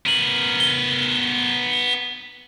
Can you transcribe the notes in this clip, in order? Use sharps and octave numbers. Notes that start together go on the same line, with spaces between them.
B3 A#4 D#7 F#7
G7